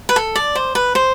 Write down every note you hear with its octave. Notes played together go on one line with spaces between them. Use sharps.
B4
A4
D5
C5
B4
C5